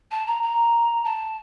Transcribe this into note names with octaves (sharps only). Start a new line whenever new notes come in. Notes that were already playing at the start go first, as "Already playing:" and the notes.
A5
A#5
A#5
A5